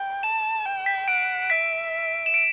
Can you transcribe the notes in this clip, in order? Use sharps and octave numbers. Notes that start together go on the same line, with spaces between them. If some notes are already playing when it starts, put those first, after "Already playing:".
Already playing: G5
A5 E7
G5
B6
F#5 D7
E5 B6
E7
D7